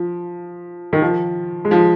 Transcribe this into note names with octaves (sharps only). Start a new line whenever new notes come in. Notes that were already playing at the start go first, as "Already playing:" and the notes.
Already playing: F3
D#3
F3
G#3
F3